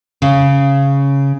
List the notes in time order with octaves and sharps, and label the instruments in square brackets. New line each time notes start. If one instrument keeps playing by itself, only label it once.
[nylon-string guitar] C#3